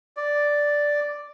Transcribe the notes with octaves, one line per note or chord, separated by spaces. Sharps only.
D5